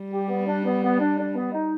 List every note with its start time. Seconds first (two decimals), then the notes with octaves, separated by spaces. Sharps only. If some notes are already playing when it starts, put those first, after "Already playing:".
Already playing: G3
0.12 G4
0.29 B3
0.46 D4
0.65 B3
0.82 B3
0.99 D4
1.18 D4
1.35 B3
1.52 D#4